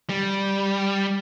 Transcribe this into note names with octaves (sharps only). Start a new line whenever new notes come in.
G3